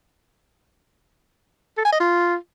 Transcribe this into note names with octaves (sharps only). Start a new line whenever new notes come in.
A4
G#5
D#5
F4